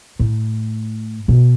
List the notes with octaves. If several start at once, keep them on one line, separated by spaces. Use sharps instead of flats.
A2
B2